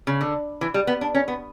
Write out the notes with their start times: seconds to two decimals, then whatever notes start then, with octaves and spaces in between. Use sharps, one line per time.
0.07 C#3
0.21 D3
0.61 E3
0.74 G3
0.87 B3
1.01 D4
1.15 C#4
1.28 B3